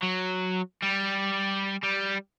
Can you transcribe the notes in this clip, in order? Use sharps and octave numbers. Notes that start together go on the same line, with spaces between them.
F#3
G3
G3